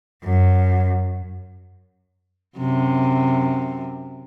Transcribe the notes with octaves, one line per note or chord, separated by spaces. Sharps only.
F#2
F#2 C3